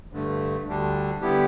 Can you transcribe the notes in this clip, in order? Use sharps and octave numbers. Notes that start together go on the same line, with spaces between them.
G2 D3 A3
D2 D3 G3 D4
D3 G3 B3 E4 G4